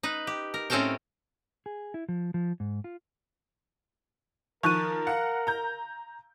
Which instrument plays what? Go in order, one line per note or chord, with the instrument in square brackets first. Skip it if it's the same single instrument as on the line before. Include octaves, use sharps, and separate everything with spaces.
[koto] D#4 B4
G4
A#4
A2 C4 C#4 A4 A#4 G5
[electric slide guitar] G#4
E4
F3
F3
G#2
F4
[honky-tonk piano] D#3 F3 [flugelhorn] A#4 [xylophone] C#6 F#6 D#7
[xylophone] F5 [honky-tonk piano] F#5
[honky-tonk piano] A#5 G6